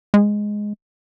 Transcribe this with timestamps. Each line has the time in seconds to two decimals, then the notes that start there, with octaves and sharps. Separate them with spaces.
0.14 G#3